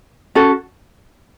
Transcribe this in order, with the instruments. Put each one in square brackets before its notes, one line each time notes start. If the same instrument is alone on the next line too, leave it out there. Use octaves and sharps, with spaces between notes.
[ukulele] C#4 F#4 A4